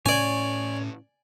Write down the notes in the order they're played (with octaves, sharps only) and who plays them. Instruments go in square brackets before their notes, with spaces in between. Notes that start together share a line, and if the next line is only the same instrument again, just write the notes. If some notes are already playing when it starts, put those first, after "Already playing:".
[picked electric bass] A2 C#4 [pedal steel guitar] C#5 [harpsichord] D5 G#5